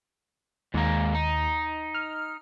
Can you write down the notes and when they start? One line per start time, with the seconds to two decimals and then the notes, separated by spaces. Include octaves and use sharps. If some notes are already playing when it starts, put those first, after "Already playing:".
0.74 D#2 G#2 A#3
1.15 D#4
1.94 F6